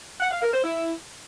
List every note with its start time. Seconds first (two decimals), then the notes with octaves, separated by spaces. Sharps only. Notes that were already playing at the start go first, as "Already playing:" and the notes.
0.21 F#5
0.31 F5
0.42 A#4
0.53 C5
0.64 E4